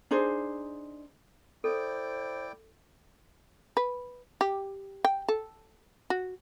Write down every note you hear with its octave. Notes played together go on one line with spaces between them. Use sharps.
D4 D#4 G#4 C5
E4 A4 C5 D5 G5
B4
G4
G5
A4
F#4